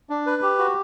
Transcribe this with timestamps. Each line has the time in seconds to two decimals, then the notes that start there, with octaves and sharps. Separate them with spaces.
0.10 D4
0.27 B4
0.42 G4
0.59 F#4